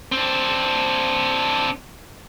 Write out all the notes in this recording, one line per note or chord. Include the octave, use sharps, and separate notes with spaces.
C4 D4